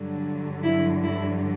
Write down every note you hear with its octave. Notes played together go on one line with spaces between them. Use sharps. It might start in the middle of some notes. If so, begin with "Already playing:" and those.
Already playing: G2 D3 F#3
E4
E4